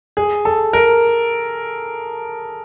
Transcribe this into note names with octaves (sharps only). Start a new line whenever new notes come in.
G#4
A4
A#4